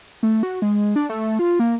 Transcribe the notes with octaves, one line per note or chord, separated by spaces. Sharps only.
A3
F#4
G#3
D4
A3
F4
A#3